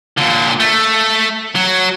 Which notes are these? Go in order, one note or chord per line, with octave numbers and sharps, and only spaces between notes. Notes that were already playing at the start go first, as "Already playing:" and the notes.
A#2 D3
A3
F#3